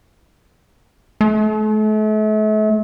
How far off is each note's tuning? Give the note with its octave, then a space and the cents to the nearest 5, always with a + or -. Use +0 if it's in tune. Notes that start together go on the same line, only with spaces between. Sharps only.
A3 -40